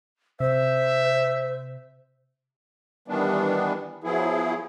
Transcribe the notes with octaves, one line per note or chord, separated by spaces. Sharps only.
C3 C5 E5
D#3 E3 G3 B3 D4
F3 F#3 B3 E4 G#4